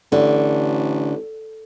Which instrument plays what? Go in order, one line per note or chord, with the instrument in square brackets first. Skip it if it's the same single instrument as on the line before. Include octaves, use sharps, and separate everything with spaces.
[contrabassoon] A1 [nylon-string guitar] D3